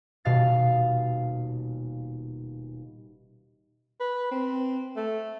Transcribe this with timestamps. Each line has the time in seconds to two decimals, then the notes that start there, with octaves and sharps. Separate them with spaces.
0.25 D#1 B2 F5 A6
4.00 B4
4.31 C4
4.96 A3